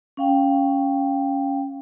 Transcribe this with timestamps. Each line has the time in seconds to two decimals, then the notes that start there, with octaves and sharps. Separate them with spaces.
0.17 C#4 F5 G5